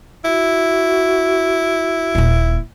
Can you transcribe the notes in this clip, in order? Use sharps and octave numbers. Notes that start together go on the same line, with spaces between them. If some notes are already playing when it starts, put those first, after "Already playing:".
E4 F#4
D#1 A#2